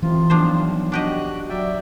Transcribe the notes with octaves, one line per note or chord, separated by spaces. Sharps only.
F1 C3 E3 F4
B1 F3 D4 C5
D4 F#4 G4 D#5 F#6
F#3 D5 E5 G5